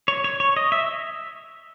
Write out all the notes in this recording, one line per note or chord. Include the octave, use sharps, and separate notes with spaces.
C#5
C#5
C#5
D#5
E5